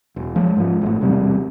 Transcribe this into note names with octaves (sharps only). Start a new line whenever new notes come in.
E1
F3 G#3
G#2 F3
G#1 A2
E1 C3 G3